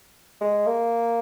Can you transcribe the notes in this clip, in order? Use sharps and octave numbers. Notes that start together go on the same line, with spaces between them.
G#3
A#3